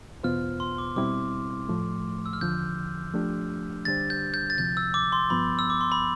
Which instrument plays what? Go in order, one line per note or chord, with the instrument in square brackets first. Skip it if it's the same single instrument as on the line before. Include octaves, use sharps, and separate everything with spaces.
[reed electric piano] E2 B2 B3 F4 C5 [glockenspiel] F6
[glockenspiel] C6
D6
[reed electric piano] B2 G3 C4 E4 [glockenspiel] D6
[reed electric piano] A2 F3 A3
[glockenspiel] E6
F6
[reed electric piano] E2 D3 F3 [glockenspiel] G6
[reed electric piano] F3 A3 D4 G4
[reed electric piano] D3 G3 D4 G4 C5 [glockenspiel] A6
[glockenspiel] G6
G6
A6
[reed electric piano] D2 C3 F3 [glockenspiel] G6
[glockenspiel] E6
D6
C6
[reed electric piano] G2 F3 B3 [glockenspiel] B5
[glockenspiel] E6
D6
C6
B5